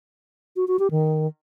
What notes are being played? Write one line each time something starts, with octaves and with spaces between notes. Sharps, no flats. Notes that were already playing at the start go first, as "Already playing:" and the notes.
F#4
F#4
G4
D#3